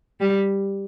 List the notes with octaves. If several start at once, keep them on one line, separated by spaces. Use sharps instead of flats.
G3